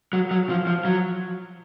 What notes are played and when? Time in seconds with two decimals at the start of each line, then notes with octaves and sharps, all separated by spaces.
0.13 F#3
0.31 F#3
0.49 F3
0.67 F3
0.85 F#3